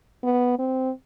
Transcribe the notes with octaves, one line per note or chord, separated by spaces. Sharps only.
B3
C4